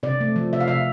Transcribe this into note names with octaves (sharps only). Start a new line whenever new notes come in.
C3 D5
A3
F3
C3 E5
F5
C3 E5